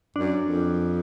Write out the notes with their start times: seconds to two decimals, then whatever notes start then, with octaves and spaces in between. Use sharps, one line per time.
0.16 F#2 D4
0.40 F2